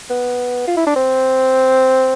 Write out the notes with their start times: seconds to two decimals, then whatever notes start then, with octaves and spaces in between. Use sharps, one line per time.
0.10 B3
0.67 F4
0.77 E4
0.87 D4
0.96 C4